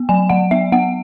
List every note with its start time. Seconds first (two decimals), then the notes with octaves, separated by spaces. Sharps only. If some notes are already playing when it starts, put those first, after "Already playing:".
Already playing: B3
0.09 F#3 G#5
0.29 F#3 F#5
0.51 B3 E5
0.72 B3 F#5